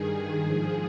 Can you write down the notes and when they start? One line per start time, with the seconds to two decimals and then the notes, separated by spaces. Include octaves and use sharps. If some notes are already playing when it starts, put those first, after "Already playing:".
Already playing: G2 D#3 G#4
0.39 G#2 F3 G#4